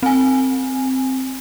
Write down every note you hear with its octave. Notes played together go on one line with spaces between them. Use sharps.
C4 G#5